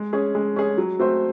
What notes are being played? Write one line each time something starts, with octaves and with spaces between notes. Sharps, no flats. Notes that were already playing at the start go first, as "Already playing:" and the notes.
Already playing: G#3
C#4 G#4
G#3
C#4 G#4
F#3
A3 C4 F#4 C5